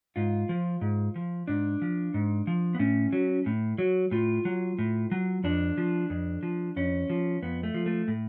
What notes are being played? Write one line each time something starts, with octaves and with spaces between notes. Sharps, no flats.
G#2 F4
F3
G#2
F3
G#2 D4
F3
G#2
F3
B3
A2 C#4
F#3
A2
F#3
A2 F4
F#3
A2
F#3
F2 D4
F3
F2
F3
F2 C#4
F3
F2 B3
A3
F3
A3
A2